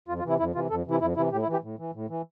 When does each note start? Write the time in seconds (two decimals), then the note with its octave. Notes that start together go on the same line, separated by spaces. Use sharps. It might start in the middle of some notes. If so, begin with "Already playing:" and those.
0.08 F2 F4
0.19 F4
0.24 C3 E3 E4
0.39 F2 E4
0.55 C3 E3 F4
0.70 F2 A4
0.86 C3 E3 E4
1.01 F2 E4
1.17 C3 E3 E4
1.32 A2 G4
1.42 E4
1.48 E3
1.53 G4
1.63 A2
1.79 E3
1.94 A2
2.09 E3